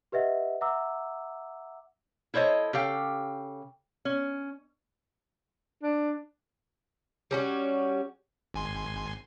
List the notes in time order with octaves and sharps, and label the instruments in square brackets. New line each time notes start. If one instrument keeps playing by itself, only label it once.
[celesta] G4 B4 D#5 E5 F#5
E5 F#5 A#5 D6 E6
[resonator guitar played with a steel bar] E4 A4 C5 C#5 D#5
C#3 G4 A4 F5 G5
C#4
[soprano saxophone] D4
[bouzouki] G3 C#4 F#4
[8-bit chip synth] G#1 G#5 C6